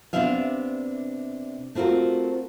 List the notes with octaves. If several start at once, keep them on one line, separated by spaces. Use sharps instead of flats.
C3 B3 D4 D5 E5 F5
A3 C4 F4 F#4 A#4